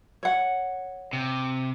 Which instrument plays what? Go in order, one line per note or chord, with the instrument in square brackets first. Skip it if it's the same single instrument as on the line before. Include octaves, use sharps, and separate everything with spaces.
[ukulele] C#5 F#5
[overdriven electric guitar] C3